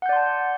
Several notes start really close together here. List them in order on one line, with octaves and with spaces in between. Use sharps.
F#5 G6 D5 C6 A5